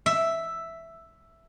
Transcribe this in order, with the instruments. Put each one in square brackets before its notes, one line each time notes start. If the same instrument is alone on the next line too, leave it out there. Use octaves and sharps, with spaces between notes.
[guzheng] E5